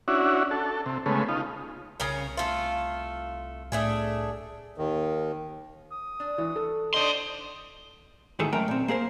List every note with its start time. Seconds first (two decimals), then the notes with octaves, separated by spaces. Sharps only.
0.08 C#4 D4 E4 F#4
0.51 A4
0.86 C3
1.06 C#3 G#3 A3 B3
1.29 D#4 F4
2.00 C2 C#3 C#4 A#4
2.37 A3 F4
3.72 A2 A3 D4 G#4
4.78 D#2 D#3
5.92 D#6
6.20 D4
6.38 E3 F#3
6.56 A4
6.94 D4 D#4 C5 D5 D#5 C6
8.39 D2 G#2 D#3 E3 G#4 A4
8.53 F#2 G#3 A3 A#4 G5 A#5
8.68 A#2 C4
8.88 A#3 G#4 A#4 C5